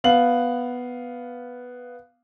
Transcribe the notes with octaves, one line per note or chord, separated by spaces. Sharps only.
B3 F5 F#7